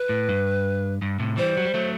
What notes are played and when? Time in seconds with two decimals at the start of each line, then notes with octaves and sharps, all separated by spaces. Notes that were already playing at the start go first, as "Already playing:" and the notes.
Already playing: B4
0.09 A2
0.29 G2
1.02 G2
1.19 A2 C3
1.37 E3 G3 C5
1.57 F#3
1.65 G3
1.74 F#3 A3